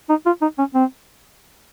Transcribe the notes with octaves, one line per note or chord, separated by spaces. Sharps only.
D#4
F4
D#4
C#4
C4